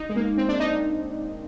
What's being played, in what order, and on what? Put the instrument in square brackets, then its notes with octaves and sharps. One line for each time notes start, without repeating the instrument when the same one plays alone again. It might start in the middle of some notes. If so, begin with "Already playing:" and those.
Already playing: [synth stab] D#4
G#3
A#3
C4
D4
D#4